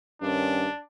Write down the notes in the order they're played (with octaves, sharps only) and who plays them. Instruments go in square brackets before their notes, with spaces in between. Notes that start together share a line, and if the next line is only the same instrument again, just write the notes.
[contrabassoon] G2 [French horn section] D#3 C#4 [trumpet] D4